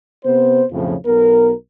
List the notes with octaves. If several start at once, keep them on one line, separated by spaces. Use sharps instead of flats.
C3 B3 C5
B1 F2 A2 C#3 F3
B1 B3 A#4